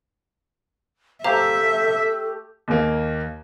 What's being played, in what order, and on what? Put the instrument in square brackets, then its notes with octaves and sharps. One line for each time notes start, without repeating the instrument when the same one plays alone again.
[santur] A3 G4 [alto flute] A4 [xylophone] C5 F5 A#5 [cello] E5
[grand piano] D#2 A#3